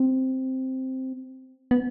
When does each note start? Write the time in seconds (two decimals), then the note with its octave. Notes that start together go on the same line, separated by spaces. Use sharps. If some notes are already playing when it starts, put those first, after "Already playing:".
Already playing: C4
1.71 B3